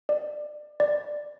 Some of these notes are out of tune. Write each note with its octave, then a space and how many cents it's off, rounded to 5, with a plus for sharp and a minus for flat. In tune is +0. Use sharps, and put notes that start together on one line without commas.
D5 +25
D5 +10